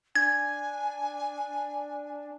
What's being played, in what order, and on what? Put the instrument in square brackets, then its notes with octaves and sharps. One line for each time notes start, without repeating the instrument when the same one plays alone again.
[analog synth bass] D4 [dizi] G#5 [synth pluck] G#6